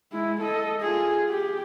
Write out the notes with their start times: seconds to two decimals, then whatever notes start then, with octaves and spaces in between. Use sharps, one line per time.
0.12 G#3 E4
0.41 A4 D#5
0.81 F4 G#4
1.29 G4